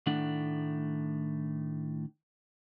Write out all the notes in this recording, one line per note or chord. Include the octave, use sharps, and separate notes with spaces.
A2 D#3 A3 D4 F#5